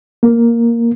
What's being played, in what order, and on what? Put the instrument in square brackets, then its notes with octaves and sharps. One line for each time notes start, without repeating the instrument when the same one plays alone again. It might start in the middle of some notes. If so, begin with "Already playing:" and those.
[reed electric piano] A#3